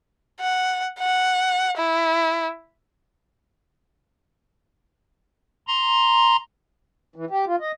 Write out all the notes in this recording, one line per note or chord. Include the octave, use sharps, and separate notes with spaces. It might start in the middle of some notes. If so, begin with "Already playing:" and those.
F#5
F#5
E4
A#5 C6
E3
G4
F4
D#5